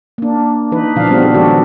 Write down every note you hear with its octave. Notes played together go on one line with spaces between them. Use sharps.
A#3 D4
E3 D#4 B4
A#2 C#3 F3 D4 F5
G3 B3 C4 D4 F#4
A4
D#3 F3 G#3 D4 F#4 G4